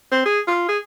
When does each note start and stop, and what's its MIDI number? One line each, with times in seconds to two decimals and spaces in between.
0.12 0.25 60
0.26 0.40 68
0.47 0.65 65
0.69 0.78 68